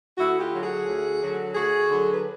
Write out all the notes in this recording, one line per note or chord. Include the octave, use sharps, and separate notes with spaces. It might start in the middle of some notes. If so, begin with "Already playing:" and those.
D2 E4 F#4
F4 G4
D3 F#3
F#4 G#4
D2
D3 F#3
D2 F#4 G#4
D3 F#3
B4